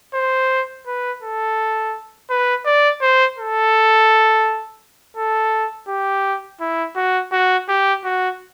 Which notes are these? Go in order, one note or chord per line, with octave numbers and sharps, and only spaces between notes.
C5
B4
A4
B4
D5
C5
A4
A4
G4
E4
F#4
F#4
G4
F#4